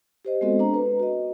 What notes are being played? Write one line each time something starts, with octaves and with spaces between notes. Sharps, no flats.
G4 C5 D#5
G#3 B3 C4 F#4 A4 D#5
D4 A#5
B4
F#4 D#5